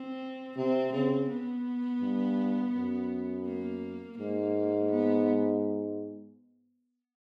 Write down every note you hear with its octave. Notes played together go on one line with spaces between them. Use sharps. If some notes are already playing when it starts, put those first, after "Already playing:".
Already playing: C4
C3 C4
C#3 C4
B3
G2
F#2
A#3
G#2 A#3
B3